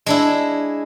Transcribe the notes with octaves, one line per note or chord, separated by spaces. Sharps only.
G#3 D4 E4